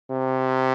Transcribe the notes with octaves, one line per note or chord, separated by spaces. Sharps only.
C3